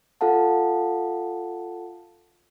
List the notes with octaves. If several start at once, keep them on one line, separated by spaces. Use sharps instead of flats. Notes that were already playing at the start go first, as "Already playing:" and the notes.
F4 A4 F5 F#5 A5